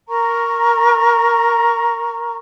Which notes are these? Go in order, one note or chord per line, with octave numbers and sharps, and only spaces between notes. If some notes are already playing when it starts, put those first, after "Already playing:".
A#4 A#5 C#6